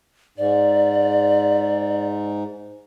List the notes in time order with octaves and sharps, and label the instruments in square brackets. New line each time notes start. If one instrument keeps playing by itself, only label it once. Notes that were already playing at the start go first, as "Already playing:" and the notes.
[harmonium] G#2 [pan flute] D5